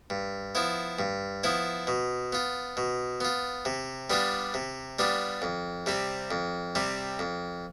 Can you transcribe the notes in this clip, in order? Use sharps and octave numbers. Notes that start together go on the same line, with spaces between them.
G2
F3 B3 E4
G2
F3 B3 E4
B2
B3 F4
B2
B3 F4
C3
G3 B3 D4 F4
C3
G3 B3 D4 F4
F2
C3 G3 C4
F2
C3 G3 C4
F2